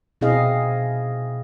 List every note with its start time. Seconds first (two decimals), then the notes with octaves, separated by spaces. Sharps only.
0.21 B2 C4 E4 G#4 D#5 F5